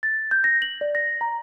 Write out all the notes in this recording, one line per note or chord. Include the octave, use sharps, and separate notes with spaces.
A6
G6
A#6
F#7
D5
A#6
A#5